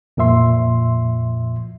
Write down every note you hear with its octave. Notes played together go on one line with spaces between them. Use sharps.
F2 A#2 F3 E5 C6